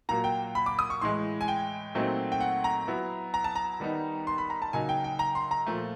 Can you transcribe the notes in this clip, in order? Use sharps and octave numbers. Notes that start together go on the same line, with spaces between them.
A#2 F#3 A#3 A#5
G5
B5
D6
D#6
C#6
A2 E3 G#3 C6
G#5
G5
A#2 F#3 A3 C4 D#4
G5
F#5
A#5
F#3 B3 E4
A#5
A5
A#5
D#3 G3 B3 D#4
C6
B5
A#5
A5
C#3 F#3 A#3 D#4 G#5
G5
G5
A#5
C6
A#5
A#2 F3 A3